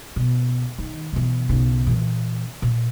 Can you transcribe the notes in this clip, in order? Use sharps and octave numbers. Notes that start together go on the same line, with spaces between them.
B2
D#3
B2 E3
B1 C#3
A#2 E3
A#2